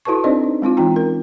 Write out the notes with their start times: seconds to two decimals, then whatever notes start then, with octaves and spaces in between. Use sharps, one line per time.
0.05 E4 F#4 A4 B4 A5 C#6
0.24 C4 D4 D#4 C5 D5 D#5
0.44 D#4
0.62 G#3 C4 E4 F4
0.77 E3 C#4 D#4 F4 G5 A#5
0.96 A#4